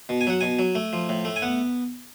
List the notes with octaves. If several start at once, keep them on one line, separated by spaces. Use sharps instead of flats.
B2
G#5
F#3 F#5
B2 G#5
F#3
A3
F3
A2
A3
G#5
B3 F#5